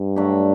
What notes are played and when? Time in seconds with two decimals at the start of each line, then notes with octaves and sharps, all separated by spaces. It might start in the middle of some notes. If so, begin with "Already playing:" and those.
Already playing: G2
0.16 F#3 A3 D4 G4